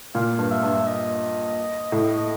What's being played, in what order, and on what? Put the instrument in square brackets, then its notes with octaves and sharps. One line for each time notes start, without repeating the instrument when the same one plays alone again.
[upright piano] A#2 [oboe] F5
[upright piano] G2
[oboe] E5
[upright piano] G2
[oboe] D#5
[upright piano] A2